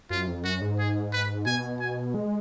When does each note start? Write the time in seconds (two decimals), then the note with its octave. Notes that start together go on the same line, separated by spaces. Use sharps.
0.10 F#2 F4
0.27 F2
0.44 F#2 F#4
0.61 G#2
0.79 G#4
1.13 B4
1.46 B2 G#5
1.80 G#5
2.14 G#3